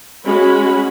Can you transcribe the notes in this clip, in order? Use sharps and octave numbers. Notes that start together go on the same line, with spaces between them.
G#3 C#4 F#4 B5